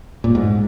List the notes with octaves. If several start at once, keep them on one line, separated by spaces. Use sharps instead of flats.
A#2
G#2